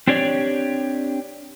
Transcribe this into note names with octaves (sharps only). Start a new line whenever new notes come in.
C4 D4 G4 C#5 D5